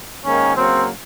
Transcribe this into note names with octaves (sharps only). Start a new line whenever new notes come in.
G#2 D#3 A#3 C#4
C#3 F#3 A#3 C4